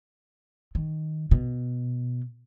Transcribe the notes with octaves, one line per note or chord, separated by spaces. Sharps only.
D#3
B2